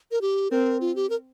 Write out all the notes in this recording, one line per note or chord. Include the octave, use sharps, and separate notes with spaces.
A#4
G4
C4 A#4
F4
G4
A#4